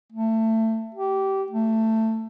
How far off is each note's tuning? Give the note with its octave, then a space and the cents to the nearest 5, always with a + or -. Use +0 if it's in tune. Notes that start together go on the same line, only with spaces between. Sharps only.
A3 +20
G4 -20
A3 +15